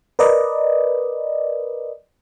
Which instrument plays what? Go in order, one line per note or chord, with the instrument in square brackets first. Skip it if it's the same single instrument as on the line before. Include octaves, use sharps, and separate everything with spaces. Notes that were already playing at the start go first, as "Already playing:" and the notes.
[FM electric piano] A#4 B4 D5 D#5